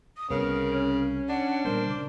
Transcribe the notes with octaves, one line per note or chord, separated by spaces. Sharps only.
D#6
C2 C#3 B3 A#4
C#4
D4 F#5
A#2 G3 B3 A#4 C5
C#3 D6